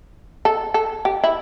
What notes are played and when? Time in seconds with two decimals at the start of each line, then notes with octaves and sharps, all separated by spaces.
0.45 A4
0.74 A4
1.05 G4
1.24 E4